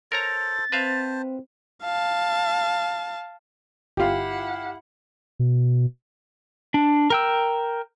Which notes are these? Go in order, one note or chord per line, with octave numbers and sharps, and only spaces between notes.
A4 A#4 C5 C#5 A#5 A6
C4 B4 C5 E5 F5 A5
F5 A5
G1 E4 F4 G4 F5 F#5
B2
D4
A#4 G5 E6